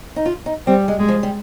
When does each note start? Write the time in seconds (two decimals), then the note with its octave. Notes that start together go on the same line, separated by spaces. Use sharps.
0.16 D#4
0.26 F4
0.46 D#4
0.67 G3 C4
0.88 G#3
0.99 G#3
1.09 F3
1.23 G3